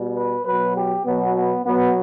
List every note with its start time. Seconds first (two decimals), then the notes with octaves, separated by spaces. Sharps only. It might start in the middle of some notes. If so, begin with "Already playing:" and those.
Already playing: B2 G3
0.16 B4
0.46 B2 F#3 B4
0.76 G4
1.05 B2 F#3 B3
1.36 B3
1.65 B2 F#3 B3